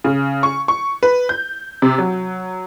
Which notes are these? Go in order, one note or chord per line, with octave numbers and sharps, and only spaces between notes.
C#3
C#6
C#6
B4
G6
C3
F#3